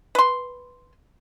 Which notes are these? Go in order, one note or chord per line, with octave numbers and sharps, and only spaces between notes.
B4 C6